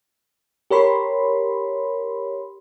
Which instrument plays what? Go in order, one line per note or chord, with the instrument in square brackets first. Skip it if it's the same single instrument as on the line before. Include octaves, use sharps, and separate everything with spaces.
[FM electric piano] G4 A#4 C#5 B5 C6